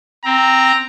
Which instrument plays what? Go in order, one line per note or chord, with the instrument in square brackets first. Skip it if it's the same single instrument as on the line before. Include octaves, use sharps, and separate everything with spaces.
[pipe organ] C4 [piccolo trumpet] A#5